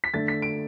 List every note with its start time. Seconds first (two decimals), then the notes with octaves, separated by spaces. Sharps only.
0.04 B6
0.14 D3 A3 A6
0.28 B6
0.42 D7